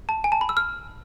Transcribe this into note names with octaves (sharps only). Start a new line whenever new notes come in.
A5
G#5
A5
B5
E6
F6